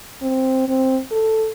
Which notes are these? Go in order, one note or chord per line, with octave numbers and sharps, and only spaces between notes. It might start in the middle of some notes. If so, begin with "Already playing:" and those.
C4
C4
A4